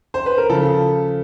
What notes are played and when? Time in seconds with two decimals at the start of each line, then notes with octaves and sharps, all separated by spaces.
0.14 C5
0.26 B4
0.38 A#4
0.49 C#3 F3 A4